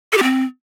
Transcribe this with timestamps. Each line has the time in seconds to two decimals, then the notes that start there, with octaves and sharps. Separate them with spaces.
0.12 A4
0.18 G4
0.23 C4